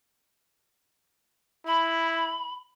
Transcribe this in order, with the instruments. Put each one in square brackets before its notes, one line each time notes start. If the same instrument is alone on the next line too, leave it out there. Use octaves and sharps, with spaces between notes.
[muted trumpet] E4 [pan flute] B5